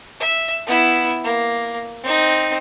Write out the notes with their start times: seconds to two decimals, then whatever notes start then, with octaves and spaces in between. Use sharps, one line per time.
0.20 E5
0.67 B3 E4
1.24 A#3
2.03 C4 D#4